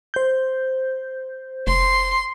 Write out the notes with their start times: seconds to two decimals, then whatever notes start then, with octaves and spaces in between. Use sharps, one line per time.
0.14 C5 G6
1.67 F1 C6